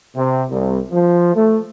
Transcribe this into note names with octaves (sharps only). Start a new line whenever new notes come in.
C3
C2
F3
A3